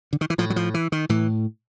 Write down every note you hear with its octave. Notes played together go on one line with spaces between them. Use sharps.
D3
D#3
E3
A2 F3
F#3
F3
E3
D#3
A2 E3